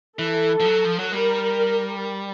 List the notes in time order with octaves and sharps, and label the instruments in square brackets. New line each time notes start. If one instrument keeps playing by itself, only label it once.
[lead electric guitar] E3 [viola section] A4
[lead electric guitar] F3
F#3
F3
F#3
[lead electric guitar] G3 [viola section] A#4